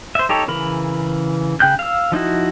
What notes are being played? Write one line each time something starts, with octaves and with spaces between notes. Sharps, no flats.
C5 E5
D#4 G4 A4 C#5
C#3 E3 A#4 B5
C#3 G5 F#6 G6
F5 E6
F3 D#4 E4 F#4